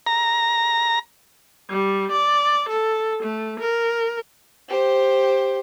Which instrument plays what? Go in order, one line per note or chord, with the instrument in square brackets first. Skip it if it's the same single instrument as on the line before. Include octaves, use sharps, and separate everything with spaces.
[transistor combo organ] A#5
[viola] G3
D5
A4
A3
A#4
[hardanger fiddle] G4 C5